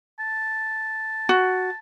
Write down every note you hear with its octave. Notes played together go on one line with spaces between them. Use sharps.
A5
F#4